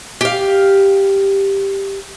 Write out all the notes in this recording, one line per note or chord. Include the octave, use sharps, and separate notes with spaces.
G4 F5